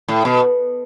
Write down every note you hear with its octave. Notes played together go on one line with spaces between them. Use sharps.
A2
B2